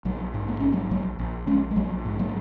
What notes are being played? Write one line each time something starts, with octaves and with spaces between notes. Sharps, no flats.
A#1 F#3
G#2
A#3
A#1 C#4
F#3 A#3
A#1 F#3 A#3
A#1
A#1 G#3 C#4
G#3
A#1 F#3 A#3
G#2
F#3 A#3